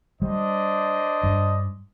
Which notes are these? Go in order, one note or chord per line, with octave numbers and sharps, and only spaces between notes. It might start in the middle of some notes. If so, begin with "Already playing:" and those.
G3 D4 C5 D#5
G2